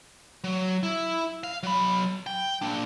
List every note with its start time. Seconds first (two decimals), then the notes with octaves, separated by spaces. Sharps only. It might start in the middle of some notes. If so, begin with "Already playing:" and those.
0.44 F#3
0.83 E4
1.44 F5
1.63 F#3 B5
2.27 G5
2.62 A#3 D4